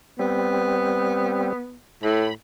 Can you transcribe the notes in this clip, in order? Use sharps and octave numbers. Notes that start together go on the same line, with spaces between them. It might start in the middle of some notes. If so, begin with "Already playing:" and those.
G3 B3 C4
A2 B5